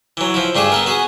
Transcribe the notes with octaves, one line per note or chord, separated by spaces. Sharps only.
E3 F#3
F3 E4
G2 A3 D4 G#4 A5
B3 A4 A#4
B3 F#4 G#4